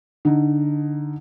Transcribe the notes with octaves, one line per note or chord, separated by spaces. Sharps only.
D3 D#4